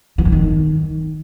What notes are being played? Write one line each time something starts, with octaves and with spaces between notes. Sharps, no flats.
E3
G2
D#3